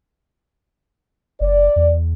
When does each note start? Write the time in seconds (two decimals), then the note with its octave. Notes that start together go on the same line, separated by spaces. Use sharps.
1.40 F#1 D5
1.76 E2